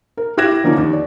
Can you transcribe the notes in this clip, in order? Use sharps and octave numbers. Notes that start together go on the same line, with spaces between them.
A#4
E4 G4 F#6 G#6 A#6 E7
E4
D3 F3 A#3 C#4 D#4
D#2
D5